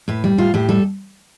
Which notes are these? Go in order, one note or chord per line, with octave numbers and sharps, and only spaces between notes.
A2 B4
G3
A2 F4
A2 G4
G3 A4